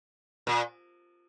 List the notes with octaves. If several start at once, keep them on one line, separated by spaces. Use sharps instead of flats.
A#2